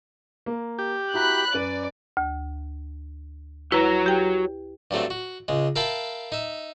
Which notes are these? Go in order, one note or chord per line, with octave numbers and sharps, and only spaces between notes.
A#3
G4
E4 F#4 A#5 B5 F#6
F#2 B4 D5 D#7
D2
E4 F#4 B4 C#5 A#5
G4 G5
G2 F#3 A3 C4
F#4
C#2 G#3
A#4 E5 F5 G5 A5 B5
D#4 E5